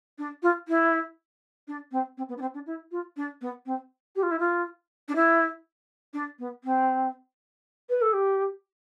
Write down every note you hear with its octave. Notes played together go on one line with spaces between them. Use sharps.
D4
F4
E4
D4
C4
C4
B3
D4
C4
D4
E4
F4
D4
B3
C4
G4
F4
E4
F4
D4
E4
D4
B3
C4
B4
A4
G4